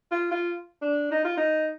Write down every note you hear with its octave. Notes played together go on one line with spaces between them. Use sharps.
F4
F4
D4
D#4
F4
D#4